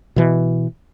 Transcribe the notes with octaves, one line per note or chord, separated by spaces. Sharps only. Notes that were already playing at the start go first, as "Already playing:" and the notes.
B2 E3